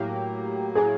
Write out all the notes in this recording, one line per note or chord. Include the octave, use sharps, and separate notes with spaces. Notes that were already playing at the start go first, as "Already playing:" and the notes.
Already playing: A2 F#3 A#3 G4
A2 F#3 A#3 G#4